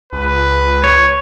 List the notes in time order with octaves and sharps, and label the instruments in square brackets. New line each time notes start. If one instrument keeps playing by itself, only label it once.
[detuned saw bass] C#2 [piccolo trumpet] B4
[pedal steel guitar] C#5